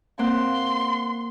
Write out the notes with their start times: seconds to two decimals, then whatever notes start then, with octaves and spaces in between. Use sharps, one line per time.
0.19 A#3 C4 F#5 C6